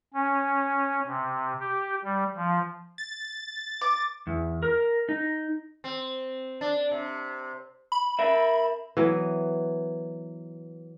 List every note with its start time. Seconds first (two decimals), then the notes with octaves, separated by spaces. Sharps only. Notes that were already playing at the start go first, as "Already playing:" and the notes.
0.14 C#4
1.07 C3
1.60 G4
2.04 G3
2.36 F3
2.98 A6
3.81 D6
4.27 E2
4.63 A#4
5.09 D#4
5.84 C4
6.61 D4
6.91 C3
7.92 B5
8.19 A#4 E5
8.97 E3 F#3 B3